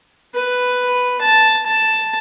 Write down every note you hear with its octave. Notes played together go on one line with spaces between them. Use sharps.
B4
A5
A5